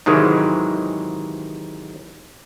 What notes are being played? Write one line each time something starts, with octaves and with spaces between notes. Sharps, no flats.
G#2 C3 D#3 E3 F#3 G#3